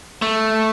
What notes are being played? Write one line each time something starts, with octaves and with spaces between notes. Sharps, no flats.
A3